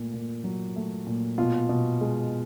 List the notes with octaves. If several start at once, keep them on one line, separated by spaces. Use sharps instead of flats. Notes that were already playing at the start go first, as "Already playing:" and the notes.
Already playing: A#2 A3
A#2
F#3
A3
A#2
B2 F4
B2
G#3